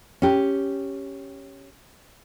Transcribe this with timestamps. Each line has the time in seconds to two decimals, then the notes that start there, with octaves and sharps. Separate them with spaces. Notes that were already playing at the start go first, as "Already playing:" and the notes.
0.22 C#4 G4